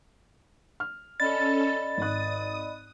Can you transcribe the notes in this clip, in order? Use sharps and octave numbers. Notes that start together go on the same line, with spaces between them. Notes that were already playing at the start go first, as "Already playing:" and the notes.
F6
C#4 A4 D5 D#5 B5 A6
G#1 D#6 F#6